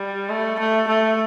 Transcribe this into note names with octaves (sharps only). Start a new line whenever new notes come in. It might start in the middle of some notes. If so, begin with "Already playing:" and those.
Already playing: G3
A3
A3
A3